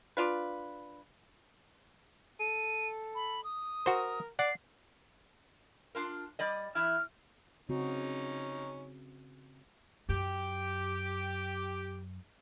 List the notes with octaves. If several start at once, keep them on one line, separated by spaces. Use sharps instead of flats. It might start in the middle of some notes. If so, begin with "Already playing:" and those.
D4 F4 B4
A4 D#7
B5
D#6
F#4 A#4 C5
D5 F#5 C7
D4 F4 A#4
G3 D5 D#5
E3 E4 F6
C#3 C4 C#4 D#4 F#4
F#2 G4